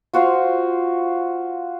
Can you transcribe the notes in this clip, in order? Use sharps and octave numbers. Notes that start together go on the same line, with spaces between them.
F4 F#4 C5 F5